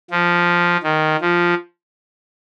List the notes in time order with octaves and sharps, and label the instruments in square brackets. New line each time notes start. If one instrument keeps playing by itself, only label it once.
[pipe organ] F3
D#3
F3